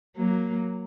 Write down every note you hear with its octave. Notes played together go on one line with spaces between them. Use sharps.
F#3 A#3